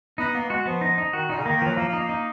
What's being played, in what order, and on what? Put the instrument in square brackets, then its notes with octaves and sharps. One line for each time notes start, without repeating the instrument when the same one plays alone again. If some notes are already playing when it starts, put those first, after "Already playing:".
[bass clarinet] B3 [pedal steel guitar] D#4
[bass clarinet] A#3 [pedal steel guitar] B3
[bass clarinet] G#3 [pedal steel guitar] F#4
[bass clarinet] F3 [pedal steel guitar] B3
[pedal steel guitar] D#4
D#4
[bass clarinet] D#3 [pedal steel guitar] F#4
[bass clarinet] A#2 [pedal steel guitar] D#4
[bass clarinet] C#3
[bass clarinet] D#3 [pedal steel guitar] A#3
[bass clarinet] D#3
[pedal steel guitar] F3 [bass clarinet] F#3
[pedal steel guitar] F3 [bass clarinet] A#3
[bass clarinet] A#3
[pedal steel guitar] D#4
[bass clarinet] A#3
[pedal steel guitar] D#4